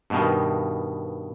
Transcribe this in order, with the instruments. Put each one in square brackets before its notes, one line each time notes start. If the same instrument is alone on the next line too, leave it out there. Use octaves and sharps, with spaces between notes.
[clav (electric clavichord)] G2 B2 D#3